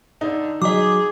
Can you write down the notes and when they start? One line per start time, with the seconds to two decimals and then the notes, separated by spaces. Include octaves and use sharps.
0.21 D3 D#4
0.62 F#3 G#4 D#5 D6